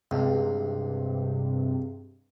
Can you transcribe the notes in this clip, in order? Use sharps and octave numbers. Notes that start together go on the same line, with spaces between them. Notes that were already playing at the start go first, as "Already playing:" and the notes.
C#2 G2 C3